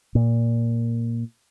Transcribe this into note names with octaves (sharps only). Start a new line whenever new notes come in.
A#2